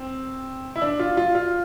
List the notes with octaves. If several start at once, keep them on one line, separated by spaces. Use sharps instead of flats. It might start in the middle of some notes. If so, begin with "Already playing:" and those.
Already playing: C4
E4
D4
F4
F4
F4